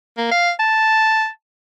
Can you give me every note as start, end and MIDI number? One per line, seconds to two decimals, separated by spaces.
0.18 0.30 58
0.31 0.51 77
0.59 1.28 81